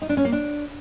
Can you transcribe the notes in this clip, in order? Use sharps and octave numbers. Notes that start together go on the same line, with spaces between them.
D#4
D4
C#4
A#3
D4